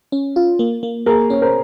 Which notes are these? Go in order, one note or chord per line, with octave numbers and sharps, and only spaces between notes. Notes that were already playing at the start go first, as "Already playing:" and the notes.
C#4
F4
A#3
A#3
A#3 G#4 A#4
C#4 C#5
A#4 C5